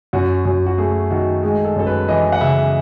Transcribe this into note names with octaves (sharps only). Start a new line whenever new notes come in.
F#2 F#4
F#2
F#4
A3 G#4
D#3 F#4
G#3 G#4
A4
F#2 A4
B4
E3 D#5
F#5
C#3 E5